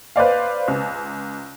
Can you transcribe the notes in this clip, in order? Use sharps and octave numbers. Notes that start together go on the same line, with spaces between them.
B4 C5 D5 F5
C#2